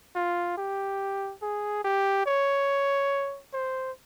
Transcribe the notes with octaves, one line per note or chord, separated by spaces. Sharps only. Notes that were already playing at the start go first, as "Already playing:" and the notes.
F4
G4
G#4
G4
C#5
C5